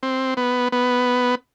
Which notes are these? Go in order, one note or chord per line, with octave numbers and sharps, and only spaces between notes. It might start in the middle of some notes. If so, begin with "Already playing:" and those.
C4
B3
B3